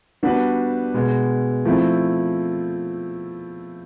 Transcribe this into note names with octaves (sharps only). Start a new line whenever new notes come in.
G3 B3 D4 F#4 B4
B2 G#3 B3
F3 A3 C4 E4